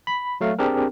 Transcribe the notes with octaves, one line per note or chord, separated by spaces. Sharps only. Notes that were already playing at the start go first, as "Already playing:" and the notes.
B5
F#3 A3 F5
C4 D4 G4 G#4 A#4